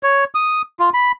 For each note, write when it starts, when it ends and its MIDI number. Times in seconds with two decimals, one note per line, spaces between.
0.03 0.24 73
0.35 0.62 87
0.80 0.90 65
0.94 1.12 83